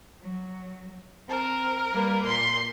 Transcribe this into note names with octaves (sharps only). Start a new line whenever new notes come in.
F#3
C4 A#4
G3 A#3 B4
A#2 C6 G6